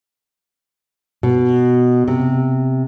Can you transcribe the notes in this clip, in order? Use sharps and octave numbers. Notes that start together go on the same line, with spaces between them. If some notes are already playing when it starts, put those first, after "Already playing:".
B2
C3